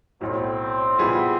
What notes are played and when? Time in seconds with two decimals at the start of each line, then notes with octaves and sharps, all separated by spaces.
0.21 B1 A2 F#3 C4
0.99 A#2 G3 B3 E4 G#4